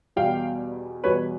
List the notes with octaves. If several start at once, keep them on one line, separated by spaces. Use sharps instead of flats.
E2 B2 G3 F5 G5
E2 B2 G3 B4 C#5